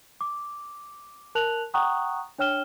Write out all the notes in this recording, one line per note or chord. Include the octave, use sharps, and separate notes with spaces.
D6
A#4 A5 F#6 F7 F#7
F#5 G5 A#5 C#6 D#6 F#6
D4 C#5 G5 F6 E7 G7